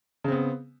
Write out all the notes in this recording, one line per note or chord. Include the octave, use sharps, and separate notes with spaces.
C#3 B3 C4